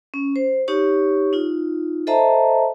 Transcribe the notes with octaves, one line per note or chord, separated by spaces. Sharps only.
C#4
C5
D#4 G4 C#5 C#6
D#4 F4
A4 C5 D#5 E5 A5 A#5